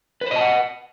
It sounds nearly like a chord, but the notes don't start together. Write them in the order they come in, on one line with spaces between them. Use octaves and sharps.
B4 C5 D#5 A5 F#5